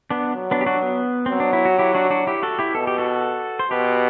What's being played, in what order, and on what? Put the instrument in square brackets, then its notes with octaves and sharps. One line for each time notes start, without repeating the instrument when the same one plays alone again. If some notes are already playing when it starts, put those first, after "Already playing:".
[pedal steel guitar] B3 D4
[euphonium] F#3
[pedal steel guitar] B3 D4
G4
D4 F#4
B3
[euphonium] F#3 [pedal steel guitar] C4
[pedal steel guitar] D4
E4
F#4
E4 G4
D4 F#4
D4 F#4
E4 G4
F#4 A4
E4 G4
[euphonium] B2 [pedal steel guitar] A4
[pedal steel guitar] G4
F#4 A4
C5
[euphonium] B2 [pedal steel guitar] G4 B4